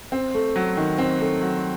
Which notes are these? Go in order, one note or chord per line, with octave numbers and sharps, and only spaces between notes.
C4
A3
F#3
D#3
C4
A3
F#3